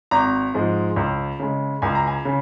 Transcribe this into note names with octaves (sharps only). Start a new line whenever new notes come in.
G#1 A#5
G#2 F3 G#3
C#2
C#3 G#3
C#2 G#5
A#5
G#5
C#3